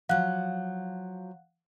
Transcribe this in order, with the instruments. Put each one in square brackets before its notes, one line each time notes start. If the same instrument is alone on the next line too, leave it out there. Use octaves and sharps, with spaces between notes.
[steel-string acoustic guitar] F3 F#3 [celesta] F5 F#5 F#6